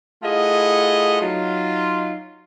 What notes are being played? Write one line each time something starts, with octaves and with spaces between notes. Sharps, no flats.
A3 E4 F4 G#4 D#5 F#5
F#3 D#4 F4